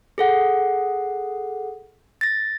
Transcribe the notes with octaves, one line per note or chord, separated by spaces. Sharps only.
G#4 A4 F#5
A6 A#6